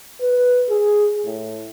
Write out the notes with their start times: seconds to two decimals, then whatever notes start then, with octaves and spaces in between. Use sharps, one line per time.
0.21 B4
0.69 G#4
1.25 A2